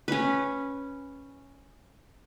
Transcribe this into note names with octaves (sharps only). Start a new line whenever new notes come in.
C#4 B4